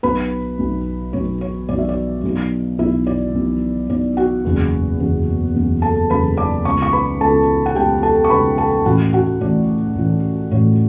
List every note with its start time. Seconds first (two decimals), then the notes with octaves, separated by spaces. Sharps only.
0.03 B1 B2 B4 B5
0.59 B1 B2
1.13 B1 B2 C#5
1.41 C#5
1.69 B1 B2 D5
1.78 E5
1.89 D5
2.24 B1 B2
2.79 B1 B2 E4 E5
3.07 D5
3.34 B1 B2
3.90 B1 B2 D5
4.17 F#4 F#5
4.45 F#1 E2 B2
5.00 F#1 E2 B2
5.55 F#1 E2 B2
5.82 A4 A5
6.10 F#1 E2 B2 B4 B5
6.37 D5 D6
6.65 C#2 B2 C#5 C#6
6.82 C#6
6.93 B4 B5
7.20 C#2 B2 A4 A5
7.66 F#5
7.75 C#2 B2 G4 G5
8.03 A4 A5
8.24 C#6
8.30 C#2 B2 B4 B5
8.58 A4 A5
8.85 A1 A2 E3 F#4 F#5
9.13 F#4 F#5
9.40 A1 A2 E3 D5
9.96 A1 A2 E3
10.51 A1 A2 E3 C#5